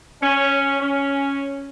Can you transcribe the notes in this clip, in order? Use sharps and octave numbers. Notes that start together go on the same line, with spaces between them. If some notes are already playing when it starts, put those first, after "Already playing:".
C#4
C#4